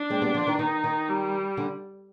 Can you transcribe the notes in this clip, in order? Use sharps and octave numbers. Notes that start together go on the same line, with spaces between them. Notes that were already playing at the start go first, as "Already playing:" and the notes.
Already playing: D4
G#3 C4
G3 B3
D3 F3
D#3
D#3 D#4
D#3
G3
D3